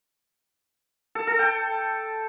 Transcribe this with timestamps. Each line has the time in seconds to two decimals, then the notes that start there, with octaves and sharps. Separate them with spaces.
1.15 A4
1.27 A4
1.39 G5